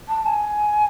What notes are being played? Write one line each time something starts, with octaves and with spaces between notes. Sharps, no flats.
A5
A5
G#5